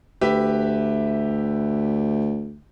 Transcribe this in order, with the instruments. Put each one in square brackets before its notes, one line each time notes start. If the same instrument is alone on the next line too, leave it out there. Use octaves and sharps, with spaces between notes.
[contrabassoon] D2 [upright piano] G4 B4 E5